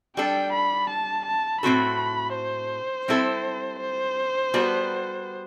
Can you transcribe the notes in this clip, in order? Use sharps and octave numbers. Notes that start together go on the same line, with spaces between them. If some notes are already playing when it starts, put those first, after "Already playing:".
G3 D4 A4 G5
B5
A5
A5
A2 F#3 C4 F#4 A4 B5
C5
G3 C4 E4 A4
C5
G3 B3 F#4 A4